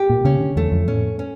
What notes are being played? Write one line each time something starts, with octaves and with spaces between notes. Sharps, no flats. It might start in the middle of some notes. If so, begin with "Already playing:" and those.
Already playing: G4
A#2
C#3 C#4
D3
E2 A3
F2
A2 C#4
C#4